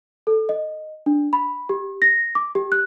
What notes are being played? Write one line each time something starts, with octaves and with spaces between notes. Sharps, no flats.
A4
D#5
D4
B5
G4
A#6
D6
G4
F#6